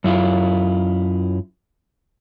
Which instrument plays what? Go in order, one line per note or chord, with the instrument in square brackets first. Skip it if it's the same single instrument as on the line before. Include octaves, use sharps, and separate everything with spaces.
[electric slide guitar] F#2 E4 F4